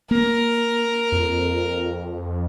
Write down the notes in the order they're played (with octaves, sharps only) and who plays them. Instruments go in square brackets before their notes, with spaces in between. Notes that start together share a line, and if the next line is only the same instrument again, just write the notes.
[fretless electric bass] A#3 [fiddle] A#4
[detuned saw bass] F2